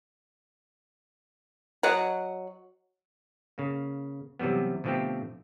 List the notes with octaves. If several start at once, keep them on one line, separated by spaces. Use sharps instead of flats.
F#3 D#5 F#5
C#3 A#3
C3 E3 F#3 G3 B3
B2 D3 F3 A3 C4 G4